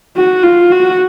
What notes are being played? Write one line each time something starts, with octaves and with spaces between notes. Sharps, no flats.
F#4
F4
F#4